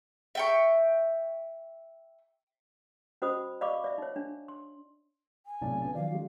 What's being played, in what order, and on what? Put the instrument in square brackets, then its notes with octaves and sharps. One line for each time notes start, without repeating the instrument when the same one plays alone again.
[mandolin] E5 G5 C#6
[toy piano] C#4 F#4 C5 D#5 B5 D#6
D5 D#5 F5 B5 C#6 D6
D5 E5
D#4 C#5
D4
C6
[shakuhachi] G#5
[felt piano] B1 D5 [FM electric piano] A2 C3 A5
[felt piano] D3 B3 [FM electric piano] A5
[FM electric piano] D#3 F3 F#3 [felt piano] D5 [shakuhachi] F5
[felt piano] G#3 F#4